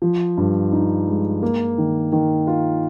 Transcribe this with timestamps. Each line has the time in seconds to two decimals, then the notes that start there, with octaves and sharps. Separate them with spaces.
0.02 F3
0.37 G2
0.72 D#4
1.07 G#3
1.43 A#3
1.78 D#3
2.12 D#3
2.47 F4